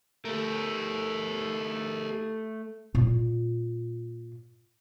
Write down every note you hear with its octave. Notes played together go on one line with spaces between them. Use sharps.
A3 G4 A#4
A#2 F4